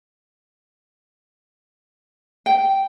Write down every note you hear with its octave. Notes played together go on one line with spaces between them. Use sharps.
G5